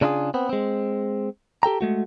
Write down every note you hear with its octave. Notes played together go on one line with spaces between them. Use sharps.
C#3 D4 E4 F4 G#4
B3 C4
G#3 C4
G4 A4 G5 A#5
G#3 A3 F#4